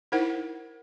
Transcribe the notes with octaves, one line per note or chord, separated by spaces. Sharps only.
D#4 E4 A#4 C5 F#5